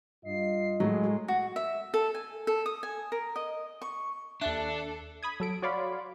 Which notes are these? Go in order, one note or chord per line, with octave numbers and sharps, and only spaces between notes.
G2 F4 D#5 C7
A2 F#3 G#3
F#4
E5
A4
G#5
A4
D#6
G#5
A#4
D#5
C#6
D#2 D4 A4 E5 A5 F#6
B5 D#6 G#6
F#3 A4 D7
F#4 C#5 D5 F5 B5 C6